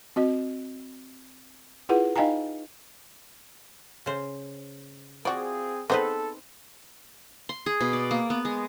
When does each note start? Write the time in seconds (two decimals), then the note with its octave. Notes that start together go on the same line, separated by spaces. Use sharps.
0.16 C4 F#4 D#5
1.89 E4 F4 G#4 B4 F#5
2.16 D#4 D#5 F5 G5 G#5 A#5
4.06 C#3 C5
5.25 F3 C4 F#4 G#4 D5
5.90 B3 C4 D#4 G#4 A4 B4 C5
7.49 C6
7.66 G#4
7.81 B2
7.93 D5
8.11 A#3
8.30 B3
8.45 G#3